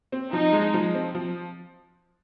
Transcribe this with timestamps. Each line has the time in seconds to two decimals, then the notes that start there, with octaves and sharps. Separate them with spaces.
0.12 C4
0.32 F3 D#4
0.53 G#3
0.74 F3
0.95 C4
1.15 F3